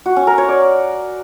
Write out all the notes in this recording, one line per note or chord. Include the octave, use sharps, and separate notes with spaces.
F#4
C#4
A#4
C#5
D5